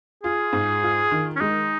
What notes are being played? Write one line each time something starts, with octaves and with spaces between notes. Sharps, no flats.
F4 G#4
G#2
F4
D#3
C#4
G#3 D#4